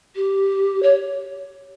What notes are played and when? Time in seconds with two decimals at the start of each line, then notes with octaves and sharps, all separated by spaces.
0.16 G4
0.83 C#5